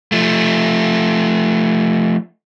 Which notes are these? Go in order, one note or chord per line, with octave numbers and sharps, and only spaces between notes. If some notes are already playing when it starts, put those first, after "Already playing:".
F3 A3